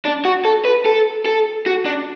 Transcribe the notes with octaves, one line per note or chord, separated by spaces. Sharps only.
D4
F#4
A4
B4
A4
A4
F#4
D4